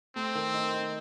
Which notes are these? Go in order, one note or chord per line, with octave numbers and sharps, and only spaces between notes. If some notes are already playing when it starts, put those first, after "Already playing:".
A3 C4
D#3
D#4
D#4